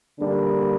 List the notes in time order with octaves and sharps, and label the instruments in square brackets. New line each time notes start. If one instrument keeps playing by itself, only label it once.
[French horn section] D3 G3 A#3 D4